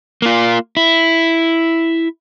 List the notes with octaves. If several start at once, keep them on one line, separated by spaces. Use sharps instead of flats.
A#3 F4
E4